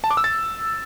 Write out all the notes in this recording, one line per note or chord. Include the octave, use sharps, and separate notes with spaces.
A5
D6
E6
A6